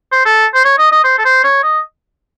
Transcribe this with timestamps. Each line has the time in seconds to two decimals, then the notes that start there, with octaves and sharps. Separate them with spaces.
0.12 C5
0.25 A4
0.54 C5
0.65 C#5
0.78 D#5
0.92 D#5
1.04 C5
1.18 A4
1.25 C5
1.44 C#5
1.63 D#5